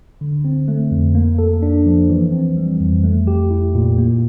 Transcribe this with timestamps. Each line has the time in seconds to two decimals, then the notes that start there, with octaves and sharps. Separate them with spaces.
0.21 D3
0.45 C4
0.68 A3
0.91 F2
1.15 A#3
1.39 A4
1.62 D4
1.86 F3
2.10 E3
2.32 C4
2.57 G3
2.80 F2
3.04 A3
3.27 G4
3.51 E4
3.75 A#2
3.98 A#3